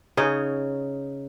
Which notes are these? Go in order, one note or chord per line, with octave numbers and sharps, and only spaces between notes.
C#3 D#4 C#5